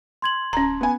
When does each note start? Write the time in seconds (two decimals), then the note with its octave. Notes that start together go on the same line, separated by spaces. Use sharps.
0.22 C6 G#6 F#7
0.53 D1 C#4 A#5
0.81 B3 G#5